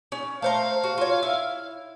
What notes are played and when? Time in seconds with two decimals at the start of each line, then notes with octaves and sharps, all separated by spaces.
0.12 C#4
0.42 A3 C5 F5 A#5
0.84 F#4
0.98 F4 C#5
1.23 E4